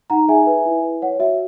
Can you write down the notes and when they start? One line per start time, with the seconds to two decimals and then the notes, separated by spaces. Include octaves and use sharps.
0.10 D#4 F#5 A#5
0.28 G#4 E5 G#5
0.47 B4
0.65 E4
0.83 B4
1.02 C#5 F#5
1.20 F#4 E5